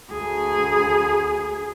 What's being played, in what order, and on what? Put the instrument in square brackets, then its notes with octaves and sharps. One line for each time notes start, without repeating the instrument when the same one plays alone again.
[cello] D2 G#4